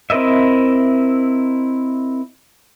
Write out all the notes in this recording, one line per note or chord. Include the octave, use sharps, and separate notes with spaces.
C4 E4 A#4 D#5 E5